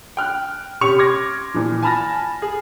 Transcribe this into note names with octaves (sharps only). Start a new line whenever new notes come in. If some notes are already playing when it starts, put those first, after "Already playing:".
G5 F6 F#6
C3 C#4 G4 C#6 C#7 F7
C6 D6 F6 G#6 A#6
A#2 E3 F3
G#5 A5 B5 F6 A6 A#6
G#4